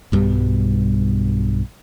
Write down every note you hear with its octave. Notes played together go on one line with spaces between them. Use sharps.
B1 G2 B2 G3